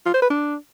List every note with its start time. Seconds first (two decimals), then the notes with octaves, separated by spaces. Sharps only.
0.06 F4
0.14 C5
0.22 B4
0.30 D4